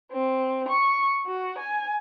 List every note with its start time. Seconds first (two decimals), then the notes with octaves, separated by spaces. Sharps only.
0.11 C4
0.68 C#6
1.25 F#4
1.57 G#5